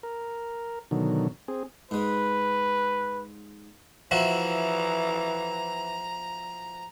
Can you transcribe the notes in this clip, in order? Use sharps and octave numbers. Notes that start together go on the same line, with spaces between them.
A#4
B2 D3 D#3 F#3
C4 G#4
G#2 G#3 B4
E3 F3 E4 F#4 A#5